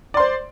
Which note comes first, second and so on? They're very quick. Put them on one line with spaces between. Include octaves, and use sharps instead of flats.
D5 C6 C5